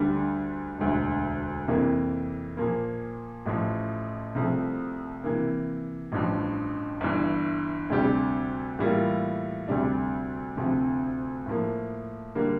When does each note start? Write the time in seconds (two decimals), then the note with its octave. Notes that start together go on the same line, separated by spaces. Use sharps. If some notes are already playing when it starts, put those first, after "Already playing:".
Already playing: D2 D3 G3 D4
0.78 E1 D2 D3
1.68 F2 C3 E3 A#3
2.57 A#2 F3 A#3
3.46 A1 A2 F3
4.35 C2 C3 F3 A3
5.24 C3 E3 A#3
6.12 A1 G2 F3
7.01 G1 G2 E3
7.90 D2 C3 G3 D4 G4
8.79 A2 E3 G3 A#3 F4
9.68 D2 C3 G3 D4
10.57 D2 C3 F3 C4
11.46 A2 F3 A#3
12.35 D3 G3 A#3